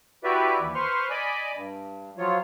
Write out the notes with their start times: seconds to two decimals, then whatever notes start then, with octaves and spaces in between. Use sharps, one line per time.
0.24 E4 F#4 G4 B4 D5 E5
0.60 D#2 E3
0.75 B4 C5 C6 C#6 F6
1.10 D5 D#5 G#5 B5 D6
1.55 G2
2.18 F3 F#3 F4 C#5